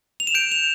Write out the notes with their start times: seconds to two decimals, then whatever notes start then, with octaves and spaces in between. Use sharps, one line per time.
0.20 F7
0.27 E7
0.35 G6 D7
0.52 F7